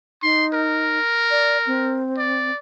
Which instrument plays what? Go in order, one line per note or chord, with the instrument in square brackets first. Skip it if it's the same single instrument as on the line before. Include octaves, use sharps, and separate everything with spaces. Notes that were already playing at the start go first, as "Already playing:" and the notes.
[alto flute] D#4 [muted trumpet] C6
[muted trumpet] A#4
[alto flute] D5
C4
[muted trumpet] D5